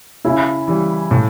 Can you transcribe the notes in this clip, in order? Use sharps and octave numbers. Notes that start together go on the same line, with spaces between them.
C#3 E4
E3 G3
A2